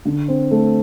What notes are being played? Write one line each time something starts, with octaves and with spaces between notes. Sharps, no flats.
D3
C4
A3